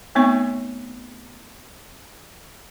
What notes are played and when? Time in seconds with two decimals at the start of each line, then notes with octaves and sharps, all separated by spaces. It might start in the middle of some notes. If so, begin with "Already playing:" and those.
0.15 A3 B3 C4 D#4 C#5 C#6